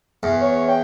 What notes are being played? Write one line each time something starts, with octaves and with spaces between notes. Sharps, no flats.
E2
C#5
G5